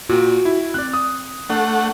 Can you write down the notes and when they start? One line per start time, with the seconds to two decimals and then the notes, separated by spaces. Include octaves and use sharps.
0.09 A#2 F#4 G5
0.45 E4
0.74 C4 D5 F#6
0.94 D#6
1.50 A3 D4 F#5